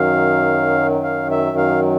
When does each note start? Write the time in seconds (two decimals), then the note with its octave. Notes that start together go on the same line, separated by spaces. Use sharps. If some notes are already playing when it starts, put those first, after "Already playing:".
Already playing: F#2 D#3 F#3 F5
1.03 F5
1.31 E5
1.57 F5